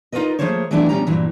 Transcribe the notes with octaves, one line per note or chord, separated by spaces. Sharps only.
D#4 F4 F#4 A#4 B4 D#5
F3 A3 A#3 G#4 C5 C#5
E3 F#3 A3 B3 D4 E4
B2 F3 G3 C#4 G4 A#5
G2 A#2 E3 F#3